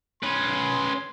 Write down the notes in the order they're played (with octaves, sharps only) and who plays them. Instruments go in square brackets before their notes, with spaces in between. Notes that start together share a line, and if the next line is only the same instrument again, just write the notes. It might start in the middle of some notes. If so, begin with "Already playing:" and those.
[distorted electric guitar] C#4 B4 [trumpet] C6